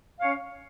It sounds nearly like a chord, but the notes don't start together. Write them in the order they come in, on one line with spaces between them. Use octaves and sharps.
F5 C#5 C#4